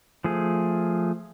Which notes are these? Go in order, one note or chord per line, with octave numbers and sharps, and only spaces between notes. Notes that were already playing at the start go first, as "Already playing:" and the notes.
F3 A3 G#4